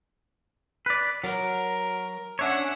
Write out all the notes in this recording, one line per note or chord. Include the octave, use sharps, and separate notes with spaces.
B4 D5
F#3 A#4
C#4 D4 C#5 E5 F#5